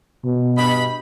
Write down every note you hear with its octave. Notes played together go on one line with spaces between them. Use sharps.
B2
G2 D#5 B5